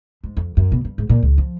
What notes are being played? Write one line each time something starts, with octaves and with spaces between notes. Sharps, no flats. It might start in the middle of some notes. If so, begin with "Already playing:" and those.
G#2
F2
F#2
B2
G2
G#2
A#2
C#2
F3